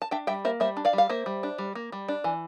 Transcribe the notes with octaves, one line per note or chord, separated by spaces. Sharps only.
A5
D4 E5 G5
G3 E5 G5
A#3 C5 E5
G3 C5 E5
D4
D5 F5
G3
F5
A#3 C5 E5
G3
D4
G3
A#3
G3
D4
E3